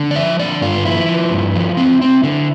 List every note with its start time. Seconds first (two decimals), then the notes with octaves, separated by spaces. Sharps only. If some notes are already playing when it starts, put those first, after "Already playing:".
Already playing: D3
0.11 D5
0.16 F3 E5
0.39 D3 D5
0.62 G2 F4
0.85 F3 E4
1.09 F3
1.31 G2
1.55 F3
1.77 C4
2.02 C4
2.24 D3